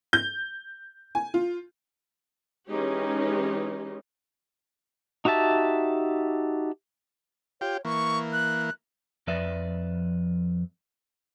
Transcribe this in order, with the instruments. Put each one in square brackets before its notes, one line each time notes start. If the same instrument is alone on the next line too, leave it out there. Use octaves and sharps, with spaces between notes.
[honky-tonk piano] G6
G#5
F4
[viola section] E3 G#3 C#4 D#4 G4
[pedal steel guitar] D#4 F#4 G4 E5 A5
[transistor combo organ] F4 G4 G5 [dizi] C#5
[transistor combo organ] E3 A#3 [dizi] C#6
[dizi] F#6
[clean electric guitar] F2 F3 B4 D5 E5